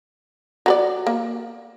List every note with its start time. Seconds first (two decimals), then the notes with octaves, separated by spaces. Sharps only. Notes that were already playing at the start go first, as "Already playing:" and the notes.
0.66 F#3 B4 D5
1.07 A#3